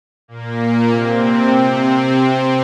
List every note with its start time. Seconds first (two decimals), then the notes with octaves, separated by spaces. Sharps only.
0.28 A#2 A#3
0.89 C3 C4
1.51 C3 C4